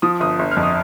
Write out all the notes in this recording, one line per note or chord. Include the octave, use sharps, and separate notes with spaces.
F3 D#6
G1 D#6
G1
F6
F2
D#6